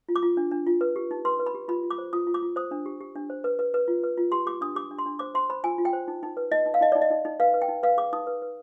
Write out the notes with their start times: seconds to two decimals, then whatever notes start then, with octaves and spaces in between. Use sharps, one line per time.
0.09 F4
0.16 D6
0.22 F4
0.37 D4
0.51 D4
0.67 F4
0.81 B4
0.96 G4
1.11 D#4
1.25 B4 C6
1.39 B4
1.46 B5
1.55 G4
1.68 F4 B5
1.83 F4
1.91 D6
1.98 C5
2.13 F4 D#6
2.27 F4
2.34 D6
2.42 F4
2.56 C5 D#6
2.71 D4
2.86 G4
3.01 G4
3.15 D4
3.30 C5
3.44 B4
3.59 B4
3.74 B4
3.88 F4
4.03 B4
4.18 F4
4.32 G4 C6
4.46 G4 D6
4.61 D4 D#6
4.75 G4 D6
4.91 D4
4.98 C6
5.06 D4
5.19 C5 D6
5.34 C5 C6
5.50 C5 B5
5.64 F4 G#5
5.78 F4
5.85 G5
5.93 C5
6.08 D#4
6.23 D#4
6.37 B4
6.52 D#4 D#5
6.66 D#4
6.74 F5
6.81 D#4 D#5
6.92 D#4 D5
7.02 D#5
7.10 D#4
7.25 D#4
7.40 B4 F5
7.54 B4
7.62 G5
7.68 D#4
7.83 B4 F5
7.97 G#4 D6
8.13 D#4 D#6
8.27 B4
8.42 B4